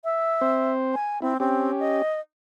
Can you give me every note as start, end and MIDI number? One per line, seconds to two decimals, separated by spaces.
0.04 0.73 76
0.41 0.95 60
0.41 0.95 72
0.94 1.21 80
1.22 1.38 60
1.22 1.34 64
1.40 1.72 60
1.40 2.02 61
1.40 2.02 67
1.79 2.20 75